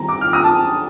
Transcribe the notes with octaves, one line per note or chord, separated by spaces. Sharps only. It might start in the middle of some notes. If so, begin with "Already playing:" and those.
Already playing: D#3 G3 C4 A#5
D6
F6
D#6
A5